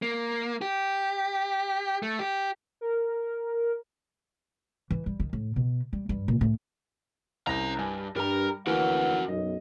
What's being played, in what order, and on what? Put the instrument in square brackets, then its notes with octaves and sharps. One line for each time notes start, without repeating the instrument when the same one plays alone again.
[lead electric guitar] A#3
G4
A3
G4
[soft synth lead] A#4
[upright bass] E3
G3
D#3
A2
B2
G3
G2
A#2
A2
[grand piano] C2 A#6 [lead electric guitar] C#4 A#5
[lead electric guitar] G2 [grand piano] G#5
[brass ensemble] G2 [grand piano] G3 [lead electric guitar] A#4 A#5
[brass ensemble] D2 B4 F#5 [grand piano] E3 A#3 [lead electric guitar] F#4 A#4
[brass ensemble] B1 F#2 [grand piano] D#5